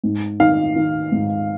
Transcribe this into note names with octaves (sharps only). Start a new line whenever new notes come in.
G#2
D#3 F5
D#3
G#2